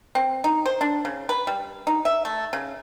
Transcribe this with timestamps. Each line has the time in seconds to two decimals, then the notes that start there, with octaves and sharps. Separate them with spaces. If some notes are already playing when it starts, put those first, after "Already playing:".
0.15 C4
0.44 D#4
0.66 C5
0.81 D4
1.05 C#3
1.29 B4
1.47 G3
1.87 D#4
2.05 E5
2.25 A3
2.53 C#3